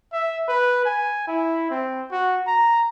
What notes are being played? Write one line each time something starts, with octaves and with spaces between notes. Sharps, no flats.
E5
B4
G#5
E4
C4
F#4
A#5